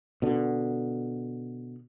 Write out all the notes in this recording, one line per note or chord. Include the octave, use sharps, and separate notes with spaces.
B2 D3